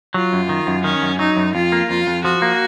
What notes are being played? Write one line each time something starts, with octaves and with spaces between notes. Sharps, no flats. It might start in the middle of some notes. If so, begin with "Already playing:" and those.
F#3 F4
F#2
D#3
F#2
D#3 C#4
F#2
F#3 D#4
F#2
F2 F4
A#3
F2 F4
F2
F3 F#4
A#3